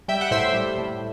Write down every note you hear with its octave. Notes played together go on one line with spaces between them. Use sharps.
G3 E5 G5
F#5
A2 C5 E5
G3
A2